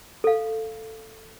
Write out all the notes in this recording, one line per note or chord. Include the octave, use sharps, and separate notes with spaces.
A4 F5